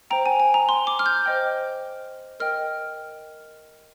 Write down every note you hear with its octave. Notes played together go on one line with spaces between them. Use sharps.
C5 G5 A#5
G#5
G#5
A#5
C6
D6
F6
G6
C5 D#5 G5
A#4 D#5 G5 F6